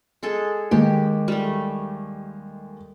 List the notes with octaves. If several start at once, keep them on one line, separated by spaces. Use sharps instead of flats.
G#3 G#4 A4
D#2 G#3 G4
G3 A3